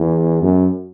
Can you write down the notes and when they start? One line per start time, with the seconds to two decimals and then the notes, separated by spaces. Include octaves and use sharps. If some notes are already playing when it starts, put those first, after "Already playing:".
Already playing: E2
0.42 F#2